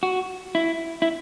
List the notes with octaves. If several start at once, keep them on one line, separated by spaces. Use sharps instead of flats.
F#4
E4
E4